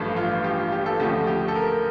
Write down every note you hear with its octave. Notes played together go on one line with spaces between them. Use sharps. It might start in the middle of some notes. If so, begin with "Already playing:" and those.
Already playing: A1 G2 F3 A3
F4
G4
F4
G4
A4
D2 C#3 F3 A3 G4
G4
A4
A#4